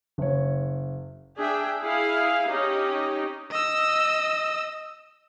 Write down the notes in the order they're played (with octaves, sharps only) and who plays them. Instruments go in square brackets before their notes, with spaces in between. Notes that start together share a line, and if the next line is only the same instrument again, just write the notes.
[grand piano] F#1 C#5
[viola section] D4 G#4 E5 G5
E4 G#4 F5
C#4 D#4 G4
[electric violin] D#5 E6